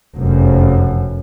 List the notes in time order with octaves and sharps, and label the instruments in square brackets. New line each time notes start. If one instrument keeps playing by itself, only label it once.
[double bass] F1 F#2